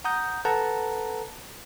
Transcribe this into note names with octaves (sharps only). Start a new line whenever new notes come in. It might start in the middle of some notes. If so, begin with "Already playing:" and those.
F#5 A#5 D#6 G6
A4 B4 F#5 A5 A#5